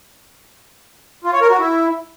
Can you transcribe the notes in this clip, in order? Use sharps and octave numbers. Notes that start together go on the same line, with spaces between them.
F4
C#5
A#4
F#4
E4